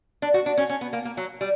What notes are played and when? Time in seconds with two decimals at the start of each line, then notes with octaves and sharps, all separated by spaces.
0.22 D4
0.34 F#4
0.46 D4
0.57 C#4
0.70 C#4
0.81 B3
0.93 A#3
1.05 A#3
1.17 F#3
1.41 G3